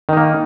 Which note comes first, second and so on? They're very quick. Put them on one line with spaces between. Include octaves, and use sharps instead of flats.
D#3 D#4 A#3